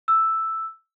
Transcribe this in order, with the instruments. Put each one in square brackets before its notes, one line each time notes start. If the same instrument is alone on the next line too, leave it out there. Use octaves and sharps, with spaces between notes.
[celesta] E6